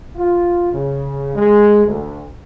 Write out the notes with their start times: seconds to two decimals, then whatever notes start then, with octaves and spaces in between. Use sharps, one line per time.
0.16 F4
0.72 C#3
1.35 G#3
1.86 D2